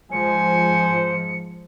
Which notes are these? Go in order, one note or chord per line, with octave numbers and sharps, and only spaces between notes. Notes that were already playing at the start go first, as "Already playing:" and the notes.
G#2 F3 G#3 C5 G#5 C#7